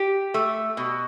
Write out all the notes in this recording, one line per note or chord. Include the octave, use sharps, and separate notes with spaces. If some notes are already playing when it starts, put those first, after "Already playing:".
Already playing: G4
A3
B2